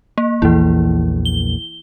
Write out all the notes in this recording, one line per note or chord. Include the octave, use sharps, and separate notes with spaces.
A#3
A#1 E2 E3 A#3 E4
G7